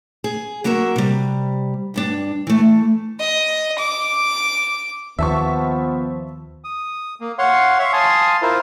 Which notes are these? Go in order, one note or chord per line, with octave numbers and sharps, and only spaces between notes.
G#4
F#3 A#3 F#4 A#4 E5
C3 G3
D2 G2 D4
E3 A3
D#5
D6
D#2 F3 B3 E5 A5 C#6
D#6
A#3
C#5 F5 F#5 C6
C#5 E5 F5 C6 C#6
F5 G#5 A5 C6 D#6
E4 F4 A#4 C5